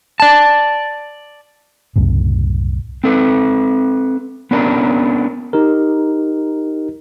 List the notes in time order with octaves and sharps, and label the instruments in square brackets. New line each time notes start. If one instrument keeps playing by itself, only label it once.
[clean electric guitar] D5 A5
[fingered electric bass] C2 F#2 A2 C#3
[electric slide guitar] C4 A4 B4
B3 C#4 D4 A#4
[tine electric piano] D#4 G4 A#4